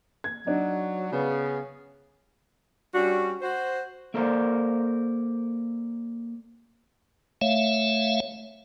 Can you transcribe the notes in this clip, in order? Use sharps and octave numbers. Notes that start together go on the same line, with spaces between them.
G#6
F#3 D4 D#4
C#3 B3
G3 C#4 D4 F#4
F#4 C5
A#3 A4 A#4 C5 D5
A3 C#5 E5 F5